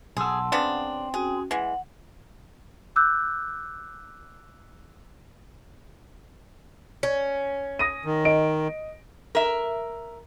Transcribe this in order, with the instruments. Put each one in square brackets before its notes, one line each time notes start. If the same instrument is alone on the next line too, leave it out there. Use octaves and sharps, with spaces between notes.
[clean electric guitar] B1 A4 [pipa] G#4 [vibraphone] F#5 C6
[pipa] C#3 B3 D4 [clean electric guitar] C4
[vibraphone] C#4 F#4 [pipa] G#4
[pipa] E3 G#3 [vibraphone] F#5
[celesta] D6 E6 F#6 G6
[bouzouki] C#4
[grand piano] D#6 A#6 D#7
[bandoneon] D#3
[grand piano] D#5 D7
[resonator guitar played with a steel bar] A#4 E5